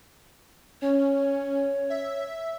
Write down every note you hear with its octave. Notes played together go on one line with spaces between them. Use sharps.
C#4 C#5
E5